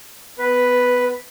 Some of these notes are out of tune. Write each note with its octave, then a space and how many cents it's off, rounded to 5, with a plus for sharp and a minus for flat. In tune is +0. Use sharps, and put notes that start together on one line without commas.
B3 +20 B4 +0